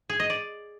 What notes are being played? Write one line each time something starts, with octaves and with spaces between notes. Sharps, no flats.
G#4
D#5
D5